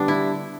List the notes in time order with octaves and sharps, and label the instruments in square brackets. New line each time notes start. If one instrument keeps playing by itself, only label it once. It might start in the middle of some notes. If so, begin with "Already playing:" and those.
Already playing: [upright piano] D3 G3 [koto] B3 D4
[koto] E4